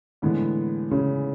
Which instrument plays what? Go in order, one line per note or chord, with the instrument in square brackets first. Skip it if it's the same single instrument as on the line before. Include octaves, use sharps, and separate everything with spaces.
[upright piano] A2 E3 G#3 B3 [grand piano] D3
[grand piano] C#3